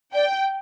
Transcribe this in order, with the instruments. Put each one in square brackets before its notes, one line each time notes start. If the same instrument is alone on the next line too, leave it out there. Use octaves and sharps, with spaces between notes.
[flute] D5 [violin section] G5